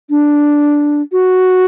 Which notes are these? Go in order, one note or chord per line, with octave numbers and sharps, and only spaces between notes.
D4
F#4